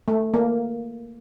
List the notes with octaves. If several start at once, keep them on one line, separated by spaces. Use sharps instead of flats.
A3
A#3